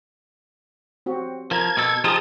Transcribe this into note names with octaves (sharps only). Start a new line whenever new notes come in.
C4 F#4 G4
F3 A#4 A5 A#5 G#6
B2 A4
F3 D#4 F4 G4 G#4 A5 A#5 D#6